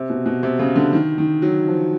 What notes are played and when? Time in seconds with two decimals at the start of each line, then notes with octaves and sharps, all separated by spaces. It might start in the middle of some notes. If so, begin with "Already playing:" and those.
Already playing: C3
0.10 B2
0.26 B2
0.43 C3
0.59 C#3
0.75 D3
0.93 D#3
1.18 D#3
1.42 F#3
1.67 F3